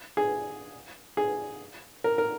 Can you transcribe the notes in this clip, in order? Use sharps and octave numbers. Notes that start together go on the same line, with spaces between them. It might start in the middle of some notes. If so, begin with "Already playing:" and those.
G#4
G#4
A#4
A#4